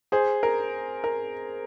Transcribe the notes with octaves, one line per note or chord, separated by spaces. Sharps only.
G#4 C5
A#4
A#4